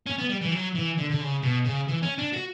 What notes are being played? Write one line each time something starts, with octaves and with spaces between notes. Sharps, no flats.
C#4
B3
G3
E3
F#3
E3
D3
D3
C#3
B2
C#3
E3
C#4
D4
F#4